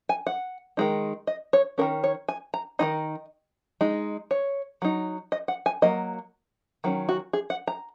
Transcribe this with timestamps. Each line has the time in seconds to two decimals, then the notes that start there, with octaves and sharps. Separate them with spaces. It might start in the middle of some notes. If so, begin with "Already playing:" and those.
0.09 G#5
0.27 F#5
0.77 D#3 G#3 D#4
1.27 D#5
1.53 C#5
1.78 D#3 F#3 C#4 A#4
2.04 C#5
2.29 G#5
2.54 A#5
2.79 D#3 G#3 D#4 D#5
3.81 G#3 D#4
4.31 C#5
4.82 F#3 D#4
5.32 D#5
5.48 F#5
5.66 G#5
5.82 F#3 A#3 D#5
6.84 D#3 F#3 C#4
7.09 F#4
7.33 G#4
7.50 F#5
7.68 A#5